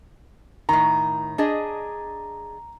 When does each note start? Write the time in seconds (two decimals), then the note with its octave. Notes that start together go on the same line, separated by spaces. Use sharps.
0.69 A2 D#3 A#5
1.38 D4 G#4 D#5